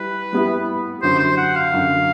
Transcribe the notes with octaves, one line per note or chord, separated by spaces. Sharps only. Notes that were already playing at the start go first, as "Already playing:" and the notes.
Already playing: G3 E4 B4
G3 B3 E4
F#2 D3 F#3 C5
C5
F#5
F5
F#2 D3 F#3